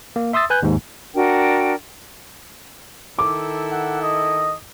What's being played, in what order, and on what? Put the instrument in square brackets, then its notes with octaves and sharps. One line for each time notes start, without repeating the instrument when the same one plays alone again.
[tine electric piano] A#3
E5 C6 D#6 E6 A6
B4 G#5 F#6 G6
D#2 G#2
[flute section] D4 F#4 A#4 G5
[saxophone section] D#3 E4 A4 [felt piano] D6
[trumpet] F#5
D#5